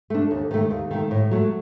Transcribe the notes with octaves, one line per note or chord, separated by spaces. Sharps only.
A3 D4
D#2
D#3 A3
D#2
D#3 A3
A2
F#3 A3